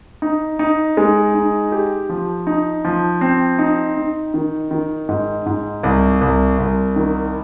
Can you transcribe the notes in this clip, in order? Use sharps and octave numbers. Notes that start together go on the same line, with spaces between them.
D#4
D#4
G#3
D#4
G4
F3
D#4
F3
C4
D#4
D#4
D#3
D#3
G#2
G#2
C2
C2
C2
D#3